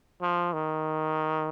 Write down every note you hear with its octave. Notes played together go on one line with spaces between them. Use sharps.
F3
D#3